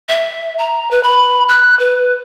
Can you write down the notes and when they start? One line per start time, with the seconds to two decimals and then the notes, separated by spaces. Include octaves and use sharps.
0.08 E5
0.58 A#5
0.91 B4
1.03 B5
1.48 F#6
1.79 B4